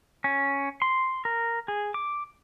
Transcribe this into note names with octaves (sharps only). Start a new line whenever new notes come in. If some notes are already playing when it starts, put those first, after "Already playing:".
C#4
C6
A#4
G#4
D6